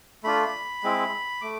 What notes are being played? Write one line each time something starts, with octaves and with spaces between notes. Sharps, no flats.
A3 D4 F4 B5
G#3 C4 E4
A3 D6